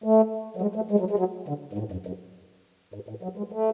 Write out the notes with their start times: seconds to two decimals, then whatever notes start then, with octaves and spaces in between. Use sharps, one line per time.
0.04 A3
0.57 F#3
0.62 G#3
0.75 A3
0.91 G#3
1.00 F#3
1.11 G#3
1.19 F#3
1.48 D3
1.73 G#2
1.78 A2
1.92 F#2
2.07 F#2
2.94 G#2
3.09 A2
3.23 F#3
3.37 G#3
3.52 A3